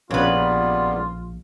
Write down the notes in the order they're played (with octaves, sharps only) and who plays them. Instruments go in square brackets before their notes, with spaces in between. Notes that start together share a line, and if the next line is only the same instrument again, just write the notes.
[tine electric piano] A#1 [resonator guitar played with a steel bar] C#3 B4 [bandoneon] G3 A#3 B3 [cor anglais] F4